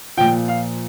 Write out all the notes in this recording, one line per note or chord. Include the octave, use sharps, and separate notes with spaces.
A#2 F3 G5
F5